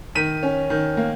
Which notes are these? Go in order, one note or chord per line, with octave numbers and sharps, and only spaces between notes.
D#3 B6 D#7
C#4
D#3
A#3